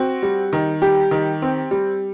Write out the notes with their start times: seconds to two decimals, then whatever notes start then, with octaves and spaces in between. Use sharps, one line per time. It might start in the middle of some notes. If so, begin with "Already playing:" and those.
Already playing: C4 F#4
0.23 G3
0.53 D#3
0.82 G3 G4
1.11 D#3
1.42 C4
1.71 G3